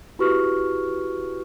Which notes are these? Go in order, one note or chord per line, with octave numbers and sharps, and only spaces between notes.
E4 F#4 G4 B4 C#6 F6